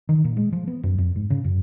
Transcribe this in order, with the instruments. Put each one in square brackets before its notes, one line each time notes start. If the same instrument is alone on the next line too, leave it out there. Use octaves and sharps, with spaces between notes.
[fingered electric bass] D#3
A#2
G#3
F3
B3
F#2
F2
G#2
C#3
F#2